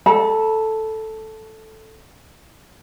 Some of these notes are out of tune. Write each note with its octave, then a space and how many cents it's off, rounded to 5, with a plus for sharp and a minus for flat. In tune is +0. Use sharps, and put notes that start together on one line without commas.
A4 +0 B5 -45